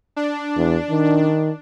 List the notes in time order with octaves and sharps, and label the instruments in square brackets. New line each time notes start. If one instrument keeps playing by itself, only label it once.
[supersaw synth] D4
[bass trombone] E2
D#3